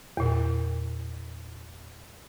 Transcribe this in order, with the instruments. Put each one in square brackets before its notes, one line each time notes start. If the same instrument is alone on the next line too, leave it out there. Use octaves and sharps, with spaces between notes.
[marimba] E2 A#2